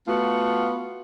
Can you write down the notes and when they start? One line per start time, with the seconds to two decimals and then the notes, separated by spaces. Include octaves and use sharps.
0.07 A3 B3 F4 F#4